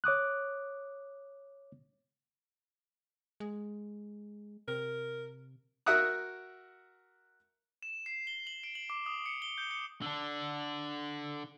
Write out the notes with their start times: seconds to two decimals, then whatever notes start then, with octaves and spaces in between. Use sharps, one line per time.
0.04 C#5 D6 D#6 F#6
3.40 G#3
4.68 C3 A#4
5.86 F#4 A#4 E5 F#5 D#6 F#6
7.83 E7
8.06 C7
8.27 G7
8.47 F#7
8.64 D7
8.75 F#7
8.90 D6
9.06 D#6
9.26 C#7
9.42 G7
9.58 G6
9.71 C#7
10.02 D3 D4